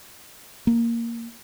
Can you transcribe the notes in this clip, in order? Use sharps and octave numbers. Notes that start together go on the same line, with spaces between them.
A#3